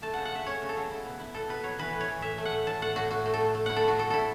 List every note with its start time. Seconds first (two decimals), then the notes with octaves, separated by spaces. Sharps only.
0.02 A3 A5
0.14 C#3 F#5
0.25 F#5
0.32 A3 E5
0.46 C#4 C#5
0.62 C#3
0.69 A4
0.77 F#3
0.91 E4
1.05 B2
1.20 E4
1.34 B2 A4
1.49 B2 B4
1.63 F#3 C#5
1.79 E3 B4
1.94 A2
2.01 C#5
2.08 E3
2.22 A2 E5
2.38 A3
2.45 F#5
2.52 A2
2.67 A2 A5
2.82 A3 F#5
2.96 A2 F#4
3.11 A2 F#4
3.25 A3
3.34 A4
3.41 A2
3.55 A3
3.66 E4 F#5
3.76 A4
3.84 A3 F#4
3.98 A2 A4
4.10 E4 A4